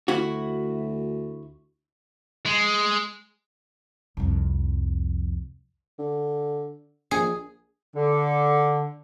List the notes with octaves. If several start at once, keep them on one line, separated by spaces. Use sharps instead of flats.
D2 E4 F#4
G#3
C2 F2
D3
A#1 G#4
D3